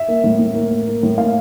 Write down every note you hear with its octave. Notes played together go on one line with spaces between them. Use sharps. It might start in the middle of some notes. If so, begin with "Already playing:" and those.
Already playing: E5
A#3
A2
A2
A#3
A#3
A#3
A2
A#3 F5